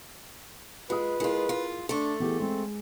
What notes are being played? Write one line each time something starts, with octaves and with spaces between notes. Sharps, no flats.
G#3 F4 B4 D#6
G#3 E4 F4 G#4 A#4
F4
A3 D4 A4 C6
E3 B3 G4 G#4
G#3 C4